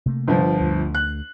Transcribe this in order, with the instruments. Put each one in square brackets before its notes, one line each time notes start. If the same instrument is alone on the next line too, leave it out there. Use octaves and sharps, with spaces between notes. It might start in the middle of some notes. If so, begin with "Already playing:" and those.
[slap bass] C3 A3 A#3
[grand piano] G1 F3
[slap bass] D2 A3
[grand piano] F#6